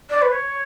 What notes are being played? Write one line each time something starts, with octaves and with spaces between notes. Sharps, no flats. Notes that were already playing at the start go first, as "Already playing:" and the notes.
D5
B4
C#5